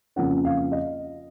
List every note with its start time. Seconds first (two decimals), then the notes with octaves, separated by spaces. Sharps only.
0.16 F2 C#3 F3 A#3 C#4 F#5
0.45 F5
0.72 D#5